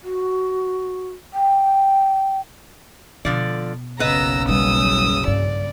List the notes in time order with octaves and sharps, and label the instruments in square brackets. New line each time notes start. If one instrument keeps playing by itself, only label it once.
[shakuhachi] F#4
G5
[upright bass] B2 [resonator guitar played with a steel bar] D3 F3 D5
[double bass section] F#1 B1 C#3 [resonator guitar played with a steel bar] B3 B4 D#5 [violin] A#5 E6
[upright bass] G3 [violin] D#6 E6
[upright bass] G2 [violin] D5